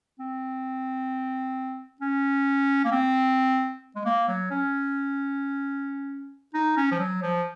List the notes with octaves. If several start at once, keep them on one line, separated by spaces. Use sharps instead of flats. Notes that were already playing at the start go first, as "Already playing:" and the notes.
C4
C#4
A#3
C4
G#3
A#3
F#3
C#4
D#4
C#4
F3
F#3
F3